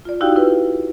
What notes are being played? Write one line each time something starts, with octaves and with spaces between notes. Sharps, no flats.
F4 D5
D#4 E4 F#4 G4 F5 G5
E4 F4 B4